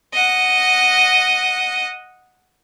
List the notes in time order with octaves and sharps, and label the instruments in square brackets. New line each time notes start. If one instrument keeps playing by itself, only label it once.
[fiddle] D#5 F#5